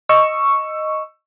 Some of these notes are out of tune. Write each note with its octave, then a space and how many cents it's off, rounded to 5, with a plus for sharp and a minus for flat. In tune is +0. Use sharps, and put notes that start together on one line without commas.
D#5 +0 C#6 +0 E6 +15